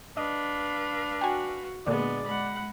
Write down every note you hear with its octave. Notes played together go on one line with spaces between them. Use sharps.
D4 B4 D#5 F5
F#4 G5 G#5
A#2 D3 G#3 B3 D4 D5
G#3 F#5 B5